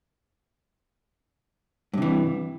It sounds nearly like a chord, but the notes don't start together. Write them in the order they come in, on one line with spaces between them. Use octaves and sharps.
G2 C3 E3